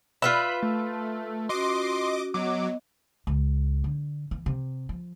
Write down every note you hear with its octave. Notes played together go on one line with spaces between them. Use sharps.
F4 B4 E5 B5
A3
C#4 F#4 D#5 C6 D6
F#3 B3 D#5 D6
C#2
D3
E3
C3
F3